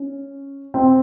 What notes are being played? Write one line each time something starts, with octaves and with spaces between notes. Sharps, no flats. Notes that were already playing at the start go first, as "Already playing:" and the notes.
Already playing: C#4
C4